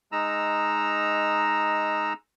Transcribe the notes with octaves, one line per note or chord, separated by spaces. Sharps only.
G#3 D#4 A#5 E6